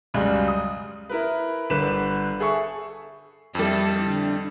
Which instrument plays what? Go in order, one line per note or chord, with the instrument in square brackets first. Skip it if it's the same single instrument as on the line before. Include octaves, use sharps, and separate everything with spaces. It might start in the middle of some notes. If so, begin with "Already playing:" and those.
[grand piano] C#2 F#2 C#3 G3 G#3
D#6
E4 A#4 B4
G1 D3 B4 E7
G#4 A4 E5 C#6
[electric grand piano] F2 G3 [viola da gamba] E4 A4
[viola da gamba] D3